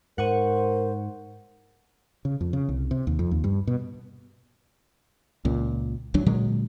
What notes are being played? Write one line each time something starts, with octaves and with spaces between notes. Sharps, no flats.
G#2 A#4 C5 F#5 C#6 D#7
C#3
F2
C#3
C2
C3
D#2
F2
D#2
G2
B2
C#2 A#2
G#1 D2 F#3 D4
A#2 D3 F#3 G#3